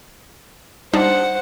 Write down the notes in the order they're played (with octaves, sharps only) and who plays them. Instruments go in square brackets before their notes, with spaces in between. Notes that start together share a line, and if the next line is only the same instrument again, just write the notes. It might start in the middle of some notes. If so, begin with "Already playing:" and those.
[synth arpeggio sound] G3 D4 D#4 [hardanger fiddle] C5 F#5